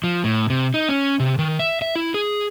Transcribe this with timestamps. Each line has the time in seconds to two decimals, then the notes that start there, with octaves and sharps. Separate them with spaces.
0.04 F3
0.24 A2
0.50 C3
0.74 D#4
0.89 C#4
1.20 C3
1.39 D#3
1.59 E5
1.82 E5
1.95 E4
2.14 G#4